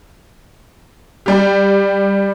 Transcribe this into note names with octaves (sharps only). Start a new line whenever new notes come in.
G3 G4